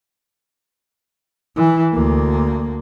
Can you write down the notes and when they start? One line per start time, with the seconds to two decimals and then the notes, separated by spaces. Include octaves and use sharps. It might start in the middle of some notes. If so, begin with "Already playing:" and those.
1.56 E3
1.93 D2 A#3